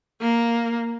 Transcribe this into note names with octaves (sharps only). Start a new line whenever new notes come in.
A#3